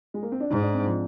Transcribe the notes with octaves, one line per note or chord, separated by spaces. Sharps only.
G#3
A#3
C4
D4
G#2 D#4
D4
C4
F3